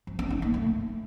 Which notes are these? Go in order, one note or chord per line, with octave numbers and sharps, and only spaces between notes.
F3
C#4
D#4
A#3
A3